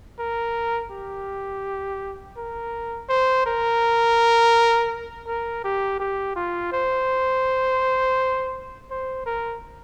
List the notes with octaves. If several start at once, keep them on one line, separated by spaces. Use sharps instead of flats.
A#4
G4
A#4
C5
A#4
A#4
G4
G4
F4
C5
C5
A#4